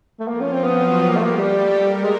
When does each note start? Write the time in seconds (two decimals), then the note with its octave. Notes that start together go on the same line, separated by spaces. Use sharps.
0.20 A3
0.27 F3 A#3 F4
0.41 C#4
0.52 C4
0.64 F#3 B3 F#4
1.01 G3 B3 G4
1.09 A#3
1.16 A3
1.23 A#3
1.38 G3 A3 A4
1.75 A#3 A#4
2.04 G#3